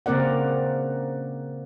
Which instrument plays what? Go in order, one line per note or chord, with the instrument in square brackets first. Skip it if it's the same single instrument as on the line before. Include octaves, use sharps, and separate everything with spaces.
[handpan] C#3 A#3 C4 A#4 D5 F#5